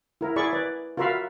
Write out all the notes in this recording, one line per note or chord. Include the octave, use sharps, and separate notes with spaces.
E4 A#4
E4 G#4 D5 B5 C#6
B4 D5
F4 F#4 A#4 E5 F5 B5